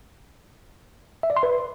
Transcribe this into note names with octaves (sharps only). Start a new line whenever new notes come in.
E5
D5
C6
B4